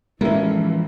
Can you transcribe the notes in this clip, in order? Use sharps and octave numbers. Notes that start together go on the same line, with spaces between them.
A1 E3 F3 G#3 A#3 C#4 E4